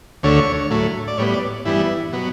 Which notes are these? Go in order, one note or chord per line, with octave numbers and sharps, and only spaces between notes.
D2 D3 A3 C#5
A2 F#3 A3
D5
A2 G3 B3 C#5
D5
G2 E3 G3 B3 E4
B2 F#3 B3